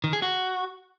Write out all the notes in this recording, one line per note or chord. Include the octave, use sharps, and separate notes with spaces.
D#3
G#4
F#4